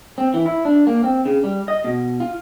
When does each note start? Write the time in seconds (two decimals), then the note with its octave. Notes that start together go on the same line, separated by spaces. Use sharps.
0.18 C4
0.34 E3
0.46 E4
0.65 D4
0.87 A#3
1.04 C4
1.25 C#3
1.44 G3
1.68 D#5
1.84 B2
2.20 F4